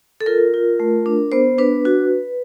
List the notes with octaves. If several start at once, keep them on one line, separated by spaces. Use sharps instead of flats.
A4
F4 A#4
F4
A3
D4
B3 C5
D4 B4
F#4